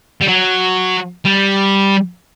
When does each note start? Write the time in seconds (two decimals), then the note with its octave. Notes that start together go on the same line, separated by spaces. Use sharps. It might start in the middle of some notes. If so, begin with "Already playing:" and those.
0.21 G3
0.27 F#3
1.25 G3